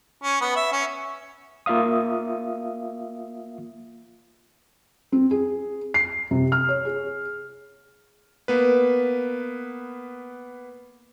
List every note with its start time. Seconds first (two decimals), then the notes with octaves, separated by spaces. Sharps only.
0.23 C#4
0.41 B3
0.56 E5
0.72 C#4
1.66 A#3 F4 E5 F5 D#6
5.12 C4
5.31 G#4
5.94 C7
6.31 C3
6.52 F6
6.69 C#5
6.85 G#4
8.48 A#3 B3 B4